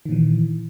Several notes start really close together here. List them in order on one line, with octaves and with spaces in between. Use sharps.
D#3 A#2 E3